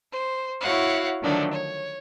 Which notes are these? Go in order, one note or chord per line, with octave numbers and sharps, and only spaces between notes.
C5
E4 F#4 C#5 F5 F#5
D3 D#3 F3 F#3 A3 D4
C#5